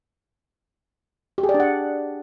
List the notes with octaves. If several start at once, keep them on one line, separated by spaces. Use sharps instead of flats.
G4
G#4
D5
D4
F#5